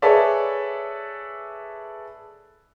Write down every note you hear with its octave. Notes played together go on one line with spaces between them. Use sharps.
G#4 A4 B4 C#5 D5 E5